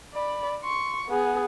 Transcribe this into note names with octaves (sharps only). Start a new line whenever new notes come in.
D5 B5
C6 C#6
B3 G#4